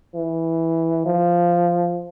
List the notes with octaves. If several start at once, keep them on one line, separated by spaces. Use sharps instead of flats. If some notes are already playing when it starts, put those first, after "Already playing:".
E3
F3